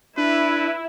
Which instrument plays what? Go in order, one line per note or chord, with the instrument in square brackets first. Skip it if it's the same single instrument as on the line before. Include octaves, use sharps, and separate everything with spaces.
[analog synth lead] D4 [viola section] E4 [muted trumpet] B4